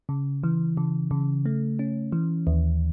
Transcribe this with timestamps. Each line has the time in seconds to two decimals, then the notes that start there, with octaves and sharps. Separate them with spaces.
0.09 C#3
0.43 E3
0.77 C#3
1.11 C#3
1.46 A3
1.79 C#4
2.12 E3
2.47 D#2